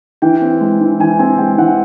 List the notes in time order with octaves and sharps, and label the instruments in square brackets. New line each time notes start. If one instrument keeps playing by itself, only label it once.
[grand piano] E3 G5
C4
G#3
E3
E3 G#5
C4 G#5
G#3 G5
E3 F#5